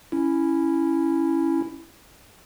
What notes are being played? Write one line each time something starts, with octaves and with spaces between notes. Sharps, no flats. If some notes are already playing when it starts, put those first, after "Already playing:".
C#4 E4